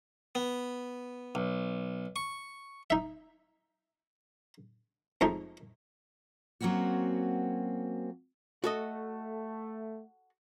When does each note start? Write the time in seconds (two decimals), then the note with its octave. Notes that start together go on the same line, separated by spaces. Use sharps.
0.35 B3
1.35 B1
2.16 C#6
2.90 D#4 E5
5.21 F2 G#3 A3 D#4
6.61 F#3 A#3 C4 C#4 F#4
8.64 A3 F#4 A4 D#5